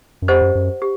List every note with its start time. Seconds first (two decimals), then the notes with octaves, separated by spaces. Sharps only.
0.22 F#2
0.28 F2 G4 C5 D#5 F#5
0.42 F#2
0.55 F#2
0.82 G4